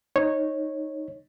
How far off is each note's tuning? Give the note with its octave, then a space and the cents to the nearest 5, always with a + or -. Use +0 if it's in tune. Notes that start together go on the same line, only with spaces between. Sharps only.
D#4 +0 C#5 -15